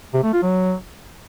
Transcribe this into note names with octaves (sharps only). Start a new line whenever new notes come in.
C3
A3
F4
F#3